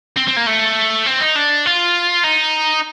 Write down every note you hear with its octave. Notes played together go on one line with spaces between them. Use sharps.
C4
C4
A#3
A3
C4
D#4
D4
F4
D#4